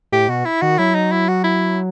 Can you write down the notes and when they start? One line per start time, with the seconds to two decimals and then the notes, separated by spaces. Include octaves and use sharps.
0.12 A2 G4
0.28 B2 F#4
0.45 E4
0.62 D#3 F#4
0.78 F#3 E4
0.95 D#4
1.12 E4
1.28 F#4
1.44 E4